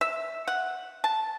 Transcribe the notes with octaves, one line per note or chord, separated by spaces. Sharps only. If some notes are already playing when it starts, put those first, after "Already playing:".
E5
F#5
A5